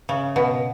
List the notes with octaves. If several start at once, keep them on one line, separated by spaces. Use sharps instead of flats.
C#3
B2